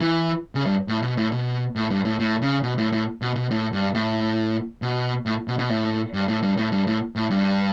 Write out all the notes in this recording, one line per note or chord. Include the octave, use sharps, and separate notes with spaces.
E3
C#3
G2
A2
B2
A2
B2
A2
G2
A2
A2
C#3
B2
A2
A2
B2
B2
A2
G2
A2
B2
A2
B2
B2
A2
G2
A2
G2
A2
G2
A2
A2
G2